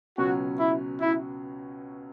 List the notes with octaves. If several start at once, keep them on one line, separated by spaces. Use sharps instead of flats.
C#2 B2 F#3 C#4 F#4
E4
E4